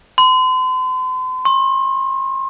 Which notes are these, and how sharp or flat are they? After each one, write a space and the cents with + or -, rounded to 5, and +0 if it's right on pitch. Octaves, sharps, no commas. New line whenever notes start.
C6 -40
C6 +45